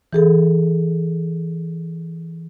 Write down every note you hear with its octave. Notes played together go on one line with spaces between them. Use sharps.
E3 G#4 A4